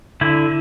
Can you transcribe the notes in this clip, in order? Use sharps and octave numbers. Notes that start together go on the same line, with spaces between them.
D3 E4